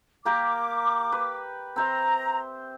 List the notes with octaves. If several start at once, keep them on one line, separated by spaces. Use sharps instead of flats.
A#3 G4 A#4 D6
B4
C4 C5 E5 A#5